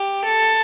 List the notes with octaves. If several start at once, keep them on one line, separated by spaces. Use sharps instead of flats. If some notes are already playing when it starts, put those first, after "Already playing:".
Already playing: G4
A4